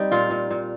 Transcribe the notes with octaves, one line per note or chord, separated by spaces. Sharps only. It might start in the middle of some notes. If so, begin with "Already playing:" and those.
Already playing: G3 C4 D#4
A#2 F4
A#2
A#2